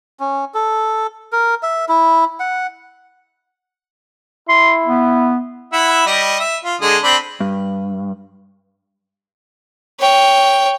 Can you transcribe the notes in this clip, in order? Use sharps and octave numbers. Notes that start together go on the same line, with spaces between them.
C#4
A4
A#4
E5
E4
F#5
E4 C6
B3
E4 E5 F#5
G3 D#5
E5
F4
D3 G#3 D#6
C4 D4 B5
G2
C#5 G5